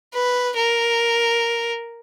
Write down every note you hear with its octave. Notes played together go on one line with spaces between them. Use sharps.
B4
A#4